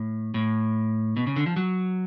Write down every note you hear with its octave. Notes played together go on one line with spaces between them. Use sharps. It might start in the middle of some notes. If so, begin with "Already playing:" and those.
Already playing: A2
A2
B2
C#3
D3
F3
F#3